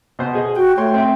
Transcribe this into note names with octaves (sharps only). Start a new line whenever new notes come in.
B2 C5
G#4 D#5
F#4 G5
A3 C#5 G5 C6
C4 E5 G5